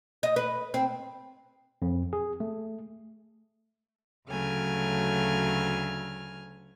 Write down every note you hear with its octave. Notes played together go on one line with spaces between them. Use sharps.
D#5
B4
C4
F2
G#4
A3
D2 C#3 F#3 A3 G#5 F6